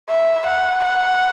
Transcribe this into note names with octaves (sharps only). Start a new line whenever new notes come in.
E5
F#5
F#5